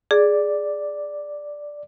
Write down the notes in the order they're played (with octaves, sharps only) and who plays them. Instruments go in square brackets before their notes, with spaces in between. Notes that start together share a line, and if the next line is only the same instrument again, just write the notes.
[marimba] G#4 [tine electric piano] D5